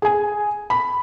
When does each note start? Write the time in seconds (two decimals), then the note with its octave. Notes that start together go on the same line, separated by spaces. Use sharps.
0.02 G#4 G#5
0.70 B5